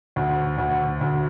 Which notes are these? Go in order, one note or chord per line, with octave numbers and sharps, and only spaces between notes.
D2
D2
D2